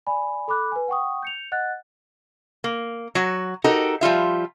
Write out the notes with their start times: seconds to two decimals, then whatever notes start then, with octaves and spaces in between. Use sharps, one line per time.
0.07 D5 G#5 B5
0.48 A4 B5 D6 F#6
0.72 B4 G#5
0.88 F#5 G5 C#6 D#6
1.23 G6 C#7 F7
1.52 D#5 F#5 F#6 A6
2.64 A#3
3.15 F#3 F#4
3.64 D#4 F#4 G4 A4 A#4
4.01 F3 G3 F4 E5